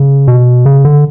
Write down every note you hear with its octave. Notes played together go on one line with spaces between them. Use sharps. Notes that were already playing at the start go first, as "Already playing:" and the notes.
Already playing: C#3
B2
C#3
D3